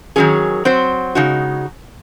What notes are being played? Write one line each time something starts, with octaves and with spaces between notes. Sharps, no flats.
D#3 F#3 C#4 G#4
F#3 C4 F#4 C5
C#3 G#3 D#4 F#4